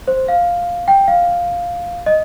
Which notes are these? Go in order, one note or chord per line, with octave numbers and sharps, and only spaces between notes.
C5
F5
G5
F5
D#5